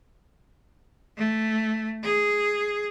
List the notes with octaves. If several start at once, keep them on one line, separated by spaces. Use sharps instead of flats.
A3
G#4